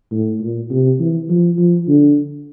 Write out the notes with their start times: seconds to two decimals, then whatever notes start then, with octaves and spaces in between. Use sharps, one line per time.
0.12 A2
0.40 A#2
0.70 C3
1.00 E3
1.29 F3
1.58 F3
1.88 D3